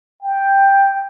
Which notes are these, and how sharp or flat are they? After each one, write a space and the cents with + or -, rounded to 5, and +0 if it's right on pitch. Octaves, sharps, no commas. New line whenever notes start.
G5 +5